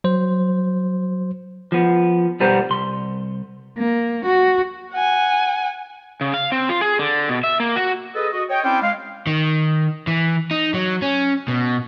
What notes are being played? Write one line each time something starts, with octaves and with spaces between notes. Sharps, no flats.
F#3 C5
F3 B3
B1 F#2 G3 B3 A#4 C5
C2 C6
A#3
F#4
F#5 G#5
C#3
F5
C4
F4
G#4
D3
B2
E5
A#3
F#4
G#4 A4 B4 D#5
F#4 D#5
C#5 D#5 G5
C4 C#4 E4 C5 D5 G5
G#3 F5
D#3
E3
D#4
F#3
C#4
B2